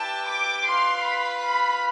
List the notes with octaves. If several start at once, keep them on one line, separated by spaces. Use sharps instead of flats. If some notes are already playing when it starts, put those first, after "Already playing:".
Already playing: E4 G4 B4 D5 G5 A5
D6
F4 B4 F5 C6
B5
B5